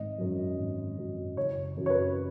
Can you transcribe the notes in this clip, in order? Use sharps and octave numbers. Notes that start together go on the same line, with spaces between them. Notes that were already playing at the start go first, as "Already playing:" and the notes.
Already playing: G#1 D#5
F#2 F#3
G#1
F#2 F#3
F#1 C#5
F#2 F#3
C#5
B4